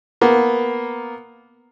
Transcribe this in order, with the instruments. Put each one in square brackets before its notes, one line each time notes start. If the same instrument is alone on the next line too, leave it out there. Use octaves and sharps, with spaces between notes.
[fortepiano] A#3 B3